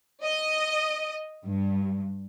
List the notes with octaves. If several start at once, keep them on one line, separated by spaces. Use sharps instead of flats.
D#5
G2